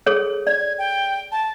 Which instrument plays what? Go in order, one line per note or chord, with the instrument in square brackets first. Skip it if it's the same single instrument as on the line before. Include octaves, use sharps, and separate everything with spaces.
[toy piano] G#4 A4 C#5
[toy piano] D5 [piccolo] G#6
[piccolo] G5
A5